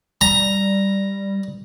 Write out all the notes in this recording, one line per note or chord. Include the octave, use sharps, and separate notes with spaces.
G3 A#5